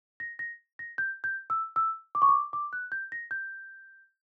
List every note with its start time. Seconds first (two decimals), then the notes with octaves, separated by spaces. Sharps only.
0.20 A#6
0.39 A#6
0.79 A#6
0.98 G6
1.24 G6
1.50 E6
1.76 E6
2.15 D6
2.22 C#6
2.29 D6
2.53 D6
2.73 F#6
2.92 G6
3.12 A#6
3.31 G6